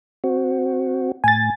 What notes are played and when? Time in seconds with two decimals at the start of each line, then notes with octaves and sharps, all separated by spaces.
0.24 C4 F#4
1.24 A2 G#5 A6